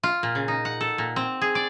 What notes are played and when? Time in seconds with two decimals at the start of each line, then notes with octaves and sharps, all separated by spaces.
0.03 F4
0.23 A#2
0.35 C#3
0.48 D#4
0.65 F#5
0.81 A4
0.98 A#2
1.16 C4
1.41 G#4
1.55 D5